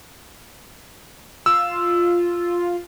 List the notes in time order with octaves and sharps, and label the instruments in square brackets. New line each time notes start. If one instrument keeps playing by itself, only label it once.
[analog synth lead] F4 [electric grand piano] E6